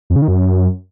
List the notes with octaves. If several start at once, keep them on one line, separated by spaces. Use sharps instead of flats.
F2
C#3
D#3
F#2